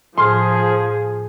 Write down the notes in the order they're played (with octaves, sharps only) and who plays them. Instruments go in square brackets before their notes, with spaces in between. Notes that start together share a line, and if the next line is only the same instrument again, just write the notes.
[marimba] A2 F6 [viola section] F3 G#4 [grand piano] C6